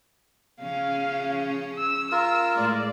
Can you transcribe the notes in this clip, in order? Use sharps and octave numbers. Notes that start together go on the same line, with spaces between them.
C#3 F3 C#4 F5
E6
F4 A#4 E6
A2 G#3 D5